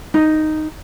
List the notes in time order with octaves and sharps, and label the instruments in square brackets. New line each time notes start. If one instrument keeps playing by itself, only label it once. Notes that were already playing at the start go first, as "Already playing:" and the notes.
[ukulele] D#4